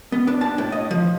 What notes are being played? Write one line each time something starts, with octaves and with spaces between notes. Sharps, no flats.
B3
D4
A5
A2
D#5
F3